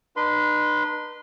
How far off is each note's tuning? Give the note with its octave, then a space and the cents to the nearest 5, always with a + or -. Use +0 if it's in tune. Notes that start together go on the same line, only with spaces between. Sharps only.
D#4 -45 B4 -25 C6 -25